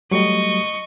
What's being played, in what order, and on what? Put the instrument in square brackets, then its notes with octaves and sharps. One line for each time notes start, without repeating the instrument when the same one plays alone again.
[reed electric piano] F#3 G3 A3 [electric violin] D#5 C#6